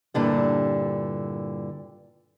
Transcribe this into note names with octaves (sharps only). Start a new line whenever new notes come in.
G2 A#2 D3 E4